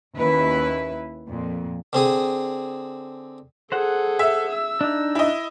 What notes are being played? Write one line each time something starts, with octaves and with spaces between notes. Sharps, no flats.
D#2 C#4 E4 B4 E5
F2 A#2
D3 C4 G#4 D#6
G#4 A4 C5 F#5
E5
E6
D4 D#4
E4 D#5